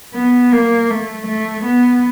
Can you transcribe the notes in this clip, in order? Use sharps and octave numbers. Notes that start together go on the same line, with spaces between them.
B3
A#3
A3
A3
B3